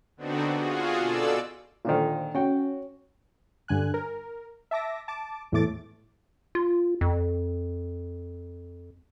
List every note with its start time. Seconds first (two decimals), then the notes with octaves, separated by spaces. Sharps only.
0.17 D3 B3 C4 D4 D#4 F#4
0.54 F4 F#4 G#4
0.98 B2 A4 D5 E6
1.85 A#2 D3 D#3 F4 C5
2.35 C#4 F#4 G5
3.68 G2 D3 G#5 F#6
3.94 A#4
4.71 E5 A5 D6 A#6
5.08 A5 D6
5.52 E2 A2 A3 D6 A6
6.55 F4
7.01 F2